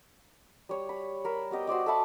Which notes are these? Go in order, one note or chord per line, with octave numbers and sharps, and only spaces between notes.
G3 C#5
B5
A#4 B5 E6
B3 G4 D#5 G5
F#4 C5 D5 D#5
A4 E5 A5 B5